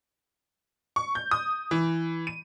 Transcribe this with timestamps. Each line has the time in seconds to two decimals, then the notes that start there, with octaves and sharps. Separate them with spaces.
0.96 C#6
1.15 G6
1.31 D#6
1.71 E3
2.27 D#7